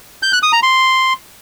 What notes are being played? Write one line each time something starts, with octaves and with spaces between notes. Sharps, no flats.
G6
F#6
D#6
A#5
C6